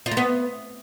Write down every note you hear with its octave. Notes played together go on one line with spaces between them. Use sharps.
F4
A3
B3